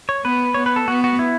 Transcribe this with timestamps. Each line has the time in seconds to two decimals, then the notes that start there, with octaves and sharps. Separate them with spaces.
0.09 C#5
0.25 B3 B4
0.54 B3 C#5
0.66 B4
0.76 A4
0.88 B3 F#4
1.04 F#4
1.19 E4